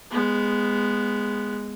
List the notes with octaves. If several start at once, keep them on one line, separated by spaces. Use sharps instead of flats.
G#3 B3